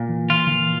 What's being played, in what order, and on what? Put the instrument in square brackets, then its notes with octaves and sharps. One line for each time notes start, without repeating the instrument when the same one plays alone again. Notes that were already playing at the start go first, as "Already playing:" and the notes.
Already playing: [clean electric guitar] A#2
[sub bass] E3
[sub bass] E3 [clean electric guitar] F4
[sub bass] D3
E3